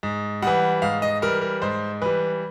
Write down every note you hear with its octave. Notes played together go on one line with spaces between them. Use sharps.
G#2
E3 G3 F#5
G#2 F5
D#5
E3 G3 A#4
A#4
G#2 C5
E3 G3 B4